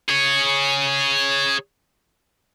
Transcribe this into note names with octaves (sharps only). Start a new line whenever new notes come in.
G#4 C#5